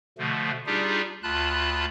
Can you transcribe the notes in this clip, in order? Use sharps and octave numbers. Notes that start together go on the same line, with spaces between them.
B2 D3 F3 A3
G3 D4 D#4 F4 G4 G#4
D2 F4 A5 B5 F#6